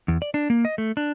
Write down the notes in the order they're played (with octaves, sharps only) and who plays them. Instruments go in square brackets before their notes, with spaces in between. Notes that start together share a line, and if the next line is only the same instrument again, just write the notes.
[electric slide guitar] E2
D5
D4
A#3
D#5
A3
D4